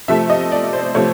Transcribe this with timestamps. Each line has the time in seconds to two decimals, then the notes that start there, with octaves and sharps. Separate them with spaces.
0.08 C3 F3 A3 E5
0.30 D#5
0.52 D5
0.73 C5
0.94 C3 F3 A3 C#5